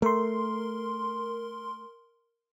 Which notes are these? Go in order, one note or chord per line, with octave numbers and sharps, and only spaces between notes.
A3 A#4 C6